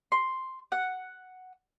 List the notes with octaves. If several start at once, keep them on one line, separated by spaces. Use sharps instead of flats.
C6
F#5